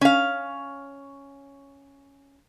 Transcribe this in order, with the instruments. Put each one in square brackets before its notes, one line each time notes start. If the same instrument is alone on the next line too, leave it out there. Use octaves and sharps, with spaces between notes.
[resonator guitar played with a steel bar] C#4 F5